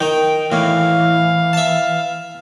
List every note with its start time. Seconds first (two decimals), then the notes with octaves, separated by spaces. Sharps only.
0.01 D#3 G5
0.52 A2 E3 F5
1.53 E5 A5